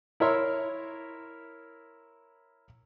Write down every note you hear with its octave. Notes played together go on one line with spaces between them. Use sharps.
E4 A#4 C#5 E5 C6